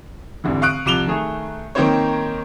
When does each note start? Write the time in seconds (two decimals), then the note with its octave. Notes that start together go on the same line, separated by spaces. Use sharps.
0.44 F1 G#2 D3 E3
0.62 F5 C#6 D#6 F#6 D7
0.86 C2 F3 D6 E7 F7 G7
1.07 D#3 A3 G#4
1.75 D#3 A#3 C4 D#4 C5 C#5